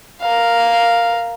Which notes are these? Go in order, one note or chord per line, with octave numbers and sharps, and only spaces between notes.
A#4 F5